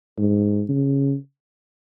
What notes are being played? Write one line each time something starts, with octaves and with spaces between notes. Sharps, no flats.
G#2
C#3